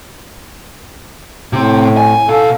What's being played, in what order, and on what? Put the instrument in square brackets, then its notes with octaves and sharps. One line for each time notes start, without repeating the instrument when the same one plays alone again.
[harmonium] A2 [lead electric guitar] C3 C4
[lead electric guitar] G#5
[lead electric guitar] B2 F5 [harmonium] A4